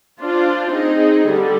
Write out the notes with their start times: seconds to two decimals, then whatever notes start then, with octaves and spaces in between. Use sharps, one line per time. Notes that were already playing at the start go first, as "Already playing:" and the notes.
0.20 D4 F4 C5
0.72 C4 D#4 G#4
1.27 D3 G3